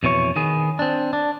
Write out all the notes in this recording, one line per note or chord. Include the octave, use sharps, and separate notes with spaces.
F2 B2 E3 C#5
D#3 B3 G#4
C4 D4
D4